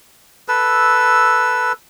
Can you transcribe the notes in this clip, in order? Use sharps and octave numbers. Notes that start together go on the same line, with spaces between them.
A4 B4 E6